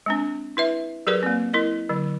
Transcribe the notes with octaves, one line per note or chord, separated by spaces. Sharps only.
G#3 C4 D4
E4 B4 E5
F#3 G4 G#4 A#4 B4 D5
A#3 C4
E4 A#4 D#5
D3 F#3